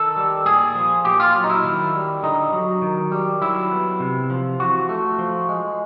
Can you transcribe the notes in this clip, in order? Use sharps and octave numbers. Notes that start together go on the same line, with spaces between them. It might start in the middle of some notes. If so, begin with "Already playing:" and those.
Already playing: D#3 A4
G3
A#2 G#4
F3
A#2 G4
F4
F#3
D#4
E4
D#3
G3
D3 D#4
F#3
D#3
G3
F#3 E4
B3
C3
F3
E3 F#4
A3
F3
G#3